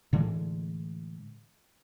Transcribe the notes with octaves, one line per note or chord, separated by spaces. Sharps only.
A2 D3 E3 G#3